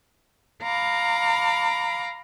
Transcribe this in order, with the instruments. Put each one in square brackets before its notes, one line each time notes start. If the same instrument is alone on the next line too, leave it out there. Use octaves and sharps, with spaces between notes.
[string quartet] F5 A#5 B5 D6